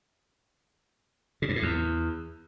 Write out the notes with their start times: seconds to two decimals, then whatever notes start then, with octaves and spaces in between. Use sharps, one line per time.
1.42 C#3
1.49 G2
1.56 A2
1.62 E2